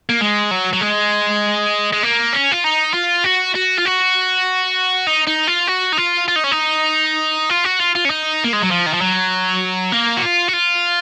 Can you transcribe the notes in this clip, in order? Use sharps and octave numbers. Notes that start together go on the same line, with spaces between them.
A#3
G#3
F#3
F#3
G#3
G#3
A#3
C#4
F4
D#4
F4
F#4
F#4
F4
F#4
D#4
D#4
F4
F#4
D#4
F4
F4
D#4
C#4
D#4
F4
F#4
F4
F4
C#4
D#4
A#3
G#3
F#3
F3
D#3
F3
F#3
A#3
F#4
F4
F#4
F4